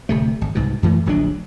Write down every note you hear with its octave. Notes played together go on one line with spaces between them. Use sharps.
D1 C3 A3
G#1
C2 G#2 B2
F#2 E3 A3
D1 A#1 F#3 D4